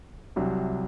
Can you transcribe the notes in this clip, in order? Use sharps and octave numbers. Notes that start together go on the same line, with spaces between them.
C2 C3 F#3